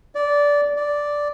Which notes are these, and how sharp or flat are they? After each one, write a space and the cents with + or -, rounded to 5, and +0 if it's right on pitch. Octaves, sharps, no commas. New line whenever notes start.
D5 -15
D5 -5